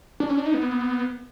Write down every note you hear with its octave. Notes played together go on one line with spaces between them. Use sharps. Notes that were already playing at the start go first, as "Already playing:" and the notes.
D4
C#4
D4
D#4
B3